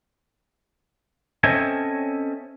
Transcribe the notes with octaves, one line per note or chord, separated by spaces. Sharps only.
C4 C#4 A4 D#5 E5 G#5